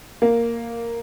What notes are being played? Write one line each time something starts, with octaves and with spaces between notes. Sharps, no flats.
A#3